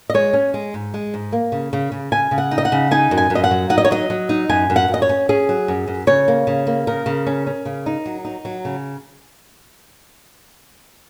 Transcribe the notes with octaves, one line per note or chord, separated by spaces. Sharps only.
D#5
G#3 C#5
C#4
G#3
G#2
G#3
G#2
A#3
C#3
C#3
C#3
C#3 G#5
C#3
F#5
D#4
D#5
F#5
C#3
D#4 G#5
F#2
G#5
F#2
D#5
F#5
F#3
D#4 F#5
D#5
C#5
F#3 D#5
F#3
D#4
F#2 G#5
F#2
F#5
F#2
D#5
C#5
C#4
C#4 G#4
F#3
F#2
F#2
C#3 C#5
A#3
C#3
A#3
C#3 A#4
C#3
C#4
C#4
C#3
D#4
F#3
D#4
F#3
C#3